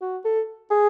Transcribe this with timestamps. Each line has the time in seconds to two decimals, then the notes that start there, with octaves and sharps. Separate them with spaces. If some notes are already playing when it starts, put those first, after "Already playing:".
0.01 F#4
0.25 A4
0.71 G#4